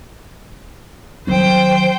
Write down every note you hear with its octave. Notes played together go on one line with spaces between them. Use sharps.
D#3 F#3 C5 G5